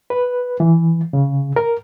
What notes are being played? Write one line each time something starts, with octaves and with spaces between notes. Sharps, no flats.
B4
E3
C#3
A#4